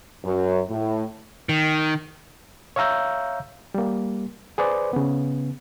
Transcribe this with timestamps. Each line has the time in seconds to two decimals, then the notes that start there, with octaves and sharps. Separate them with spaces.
0.24 F#2
0.69 A2
1.49 D#3
2.76 C#5 E5 F5 A#5 E6 G6
3.74 G3 A#3
4.58 G#4 B4 C5 D5
4.93 C#3 B3